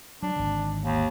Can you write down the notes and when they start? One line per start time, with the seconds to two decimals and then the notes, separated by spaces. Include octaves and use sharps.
0.23 F#3 D4
0.36 G#1 D3
0.83 D#2